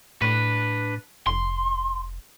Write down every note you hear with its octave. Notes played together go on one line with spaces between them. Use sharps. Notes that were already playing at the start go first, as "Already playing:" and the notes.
A2 D4 B4
F1 C6